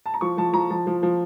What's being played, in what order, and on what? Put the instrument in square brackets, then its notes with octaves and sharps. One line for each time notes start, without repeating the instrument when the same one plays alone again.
[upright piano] A5
A#5
F3 C#6
F3 A5
F3 A#5
F3 A5
F3
F3